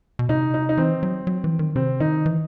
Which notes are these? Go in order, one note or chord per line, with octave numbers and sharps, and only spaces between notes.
B2
C3 D#4
D#4
D#4
E3 C4
F#3
F#3
E3
D#3
C3 C4
D#3 D#4
E3